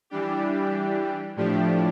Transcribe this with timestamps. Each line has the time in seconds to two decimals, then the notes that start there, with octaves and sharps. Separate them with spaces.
0.10 E3 G3 D4 G4
1.36 A2 F3 A3 D4 G4